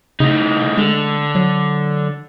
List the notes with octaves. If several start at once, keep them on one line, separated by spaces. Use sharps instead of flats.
A2 C#3 D#4
D3 G#3
F#3